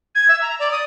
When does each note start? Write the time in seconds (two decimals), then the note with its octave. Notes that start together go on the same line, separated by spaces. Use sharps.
0.15 G#6
0.28 E5
0.41 A#5
0.59 D5
0.71 D#6